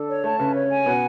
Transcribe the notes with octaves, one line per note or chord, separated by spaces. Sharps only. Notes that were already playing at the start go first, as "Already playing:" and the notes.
Already playing: D3 D4 A4
C#5
A3 A5
C#3 C#4 B4
C#5
G#5
B2 B3 F#5